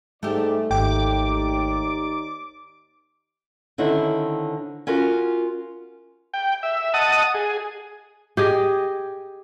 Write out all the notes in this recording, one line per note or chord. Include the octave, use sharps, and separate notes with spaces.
G#2 A3 G4 D5
G#1 D#2 D#4 D5 G5 D6
D3 D#3 C4 C#4 E4
C#4 F4 F#4 A#4
G5
E5
D#5 F#5 A5 D#6
G#4
G4 G#4 D#5